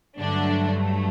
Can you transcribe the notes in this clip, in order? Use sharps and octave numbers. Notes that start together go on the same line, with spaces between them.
G2 D3 F#3 A3 D4